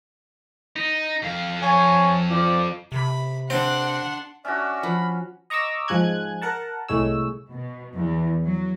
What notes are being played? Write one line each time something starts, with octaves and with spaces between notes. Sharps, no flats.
D#4
F2 F5
C#5 G#5
F3 D5
C3 B5
C4 D4 F#5 C6
C#4 D4 F#4 D5 E5
F3 B5
D#5 A#5 C#6 D6 E6
G#2 F3 G#3 G#5 F#6 G#6
A#4 F#5 A5
C2 A2 G#3 C#5 E6
B2
E2
F#3